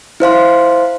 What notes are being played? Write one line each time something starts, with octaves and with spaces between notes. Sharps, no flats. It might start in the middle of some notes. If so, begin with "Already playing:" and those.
E4 C5 F5 C6